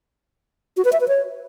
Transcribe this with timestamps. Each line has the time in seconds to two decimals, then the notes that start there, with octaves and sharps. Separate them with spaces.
0.77 F#4
0.85 B4
0.93 E5
1.00 B4
1.08 C#5